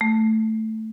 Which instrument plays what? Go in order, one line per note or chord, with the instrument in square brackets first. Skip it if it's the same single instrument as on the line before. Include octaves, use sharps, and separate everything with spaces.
[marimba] A3